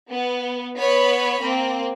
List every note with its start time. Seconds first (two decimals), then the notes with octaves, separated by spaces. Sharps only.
0.10 B3
0.77 B3 C#5 B5
1.40 A#3 C4